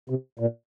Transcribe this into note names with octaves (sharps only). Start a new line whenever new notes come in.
C3
A#2